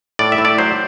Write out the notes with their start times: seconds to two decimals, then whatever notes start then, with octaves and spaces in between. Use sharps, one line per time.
0.19 A2 D5
0.32 E5
0.38 A2
0.45 D5
0.58 F#3 C5